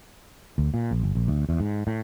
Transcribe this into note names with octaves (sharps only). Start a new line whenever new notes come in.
D2
A#2
A#1
G1
A#1
D2
E2
G#2
A2